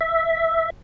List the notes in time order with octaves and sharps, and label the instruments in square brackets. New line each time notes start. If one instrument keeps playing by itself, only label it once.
[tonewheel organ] E5